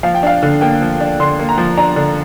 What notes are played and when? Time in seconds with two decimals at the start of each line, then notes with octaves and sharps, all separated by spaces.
0.03 F3 F5
0.15 G5
0.23 D4 F5
0.42 D3
0.61 A#3 G5
0.81 F3
1.00 D4
1.20 D3 C6
1.39 A#3
1.49 A#5
1.58 F3
1.77 D4 A#5
1.96 D3